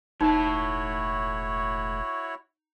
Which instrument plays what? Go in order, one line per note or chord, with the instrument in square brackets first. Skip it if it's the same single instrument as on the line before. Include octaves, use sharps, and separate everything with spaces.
[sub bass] E1 [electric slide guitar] A2 A5 [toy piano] D#4 [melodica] E4 F#4 C#5